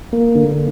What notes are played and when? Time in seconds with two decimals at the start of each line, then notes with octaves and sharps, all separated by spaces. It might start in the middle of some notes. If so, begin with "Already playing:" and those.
0.13 A#3
0.35 D3